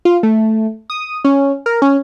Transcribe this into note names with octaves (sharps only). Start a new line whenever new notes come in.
F4
A3
D#6
C#4
A#4
C#4